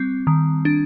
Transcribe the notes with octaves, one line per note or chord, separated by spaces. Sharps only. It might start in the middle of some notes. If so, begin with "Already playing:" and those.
Already playing: G3 C4
D#3
D4